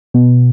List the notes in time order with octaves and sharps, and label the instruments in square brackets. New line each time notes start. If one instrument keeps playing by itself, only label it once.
[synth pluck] B2